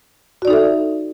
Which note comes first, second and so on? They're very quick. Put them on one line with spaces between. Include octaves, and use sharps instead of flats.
F#4 D5 D#4 A4 E5